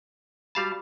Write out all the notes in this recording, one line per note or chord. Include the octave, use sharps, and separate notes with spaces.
G3 F#4 G4 F5 A5 B5